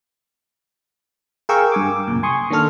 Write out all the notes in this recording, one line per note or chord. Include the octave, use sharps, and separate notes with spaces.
G#4 A#4 F5 G5 C#6 E6
G2 G#5 D6
D6
C2 F#2 A#2
G#5 C6 C#6 D#6
D#3 A#3 D4 A4 F6